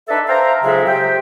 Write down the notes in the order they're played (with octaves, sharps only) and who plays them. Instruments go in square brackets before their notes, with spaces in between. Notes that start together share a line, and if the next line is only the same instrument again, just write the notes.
[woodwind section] D4 D#4 A4 B4 E5
C5 E5 F5 G5 A#5
F2 G#2 C#3 F#3 G#3 E5
G4 C5 E5 G5